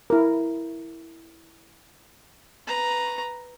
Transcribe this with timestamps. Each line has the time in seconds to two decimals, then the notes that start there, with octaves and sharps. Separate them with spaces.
0.10 E4 A#4
2.67 B4 A#5